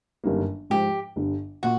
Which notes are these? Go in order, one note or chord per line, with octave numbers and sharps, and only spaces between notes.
G1 F#2 D#3 G3 A#3
G#2 F3 G#3 G4
G1 G2 D3
A#2 F#4